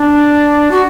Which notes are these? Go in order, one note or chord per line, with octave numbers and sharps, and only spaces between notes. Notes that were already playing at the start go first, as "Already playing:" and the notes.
Already playing: D4
F#4